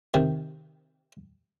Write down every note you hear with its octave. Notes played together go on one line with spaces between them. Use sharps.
C3 D#3